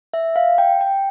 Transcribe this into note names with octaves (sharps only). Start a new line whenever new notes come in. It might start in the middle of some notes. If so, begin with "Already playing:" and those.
E5
F5
G5
G5